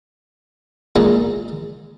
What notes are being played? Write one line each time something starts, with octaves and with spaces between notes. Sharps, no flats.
A#2 G#3 D#4